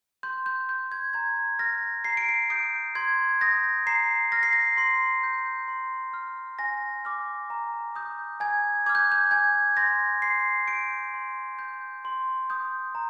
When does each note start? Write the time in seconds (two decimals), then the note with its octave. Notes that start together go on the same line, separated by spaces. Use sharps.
0.23 C6 G6
0.46 G6
0.69 G6
0.92 G#6
1.13 A#5 G#6
1.59 F6 A#6
2.04 A#5 C7
2.17 D7
2.29 C7
2.50 D#6 G6 D7
2.95 C6 G#6
3.41 D#6 G6 A#6
3.87 A#5 C7
4.32 F6 A#6
4.43 C7
4.53 A#6
4.77 C6 C7
5.23 G6
5.68 C6
6.13 F6
6.59 G#5 A#6
7.05 D6 F6
7.50 A#5
7.96 D#6 G6
8.40 G#5 G#6
8.86 D6 F6 G#6
8.95 G6
9.12 G6
9.31 G#5 G#6
9.77 C6 G6 A#6
10.22 C6 C7
10.68 G6 D7
11.14 C6
11.59 G6
12.05 C6
12.50 D#6 G6
12.95 A#5